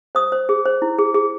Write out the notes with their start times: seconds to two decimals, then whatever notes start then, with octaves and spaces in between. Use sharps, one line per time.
0.15 C5 D#6
0.32 C5
0.49 G#4
0.65 C5
0.82 E4
0.98 G#4
1.14 G#4